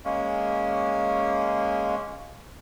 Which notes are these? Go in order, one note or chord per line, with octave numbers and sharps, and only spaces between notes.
G#3 A#3 C#4